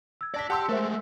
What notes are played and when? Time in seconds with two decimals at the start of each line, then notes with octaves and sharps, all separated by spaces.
0.21 E6 G#6
0.34 D5 A5 A#6 B6
0.50 G4 F#5 A5 C6 E6
0.69 G#3 A3 A#4 C5 E5